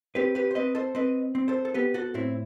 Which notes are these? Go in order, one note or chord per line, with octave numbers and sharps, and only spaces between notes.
C4 G4 B4
G4 B4
C5
C4 B4 D#5
A4 C5
C4 B4 D#5
C4
A4 C5
A4
B3 G4 B4
F#4 A4
A2 C4 E4